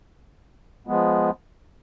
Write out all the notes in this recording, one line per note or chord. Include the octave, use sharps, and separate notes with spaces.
F3 G#3 B3